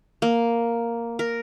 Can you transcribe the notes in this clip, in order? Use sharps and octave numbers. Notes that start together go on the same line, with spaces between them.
A#3
A#4